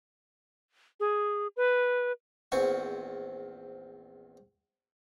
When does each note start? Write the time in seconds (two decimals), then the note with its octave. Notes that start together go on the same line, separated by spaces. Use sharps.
1.00 G#4
1.57 B4
2.52 A#1 E2 C4 G#5 C#6